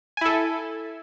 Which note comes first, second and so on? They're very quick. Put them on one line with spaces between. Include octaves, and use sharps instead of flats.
G#5 E4 A4